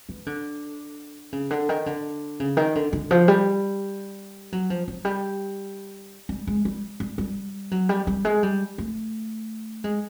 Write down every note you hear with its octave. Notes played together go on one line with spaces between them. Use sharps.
E3
D3
C#3
D3
D#3
D3
C#3
D#3
D3
D3
F3
G3
F#3
F3
F#3
G3
G3
G#3
G3
G3
G3
F#3
G3
G3
G#3
G3
A3
G#3